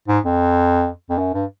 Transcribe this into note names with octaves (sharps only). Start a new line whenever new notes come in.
G#2
F2
F2
F#2
G2